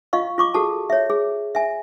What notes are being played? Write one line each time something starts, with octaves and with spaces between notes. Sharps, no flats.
F4 D#5 F5 C#6
F4 C#6 D6
F#4 G#4 A4 A5
C#5 E5
G#4
E5 G#5